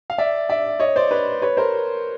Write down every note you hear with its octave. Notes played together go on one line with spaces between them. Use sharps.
F5
D5 E5
D5 E5
C#5 D#5
C5 D5
B4 C#5
B4 C#5
A#4 C5